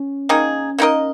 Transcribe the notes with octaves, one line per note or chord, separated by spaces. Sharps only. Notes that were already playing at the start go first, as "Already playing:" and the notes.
Already playing: C#4
D#3 A#3 D#4 G#4
A#3 D#4 A#4 D#5